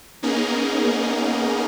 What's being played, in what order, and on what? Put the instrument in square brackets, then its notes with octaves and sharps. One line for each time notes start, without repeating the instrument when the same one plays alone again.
[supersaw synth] A#3 B3 C#4 D#4 G#4 A#4